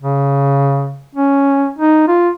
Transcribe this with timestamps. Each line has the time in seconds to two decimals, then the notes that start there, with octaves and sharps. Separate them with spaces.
0.02 C#3
1.15 C#4
1.79 D#4
2.08 F4